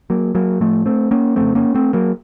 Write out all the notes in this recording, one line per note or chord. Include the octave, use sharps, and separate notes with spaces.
F#3 A#3
F#3 A#3
A2 F3 A3
A3 C4
A#3 C#4
F2 C#3 A3 C4
A#3 C#4
A3 C4
F#3 A#3